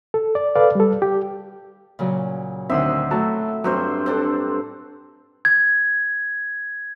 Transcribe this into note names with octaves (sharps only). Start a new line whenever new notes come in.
A4
D5
A4 B4 D5 F5
G3 A4
G4
A#2 C#3 F#3
D2 D#3 C4 E5 F#5 C6 D#6
A2 F#3 A3 A5
G2 F#3 C4 C5
C4 D4 A4 C5
G#6